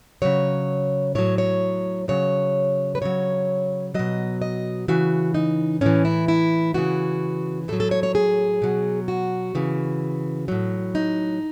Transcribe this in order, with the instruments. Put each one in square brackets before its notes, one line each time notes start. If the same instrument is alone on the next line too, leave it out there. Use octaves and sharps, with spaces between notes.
[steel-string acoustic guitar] C#3 F#3 C#5
A2 F#3 C#5
C#5
C#3 F#3 C#5
B4
C#3 F#3 C#5
B2 F#3 D#5
D#5
C#3 E3 F#4
D#4
A2 E3 C#4
E4
E4
C#3 E3 F#4
A2 A4
F#3
A4
C#5
C#5
G#4
B2 F#3
F#4
C#3 E3
A2 F#3
D#4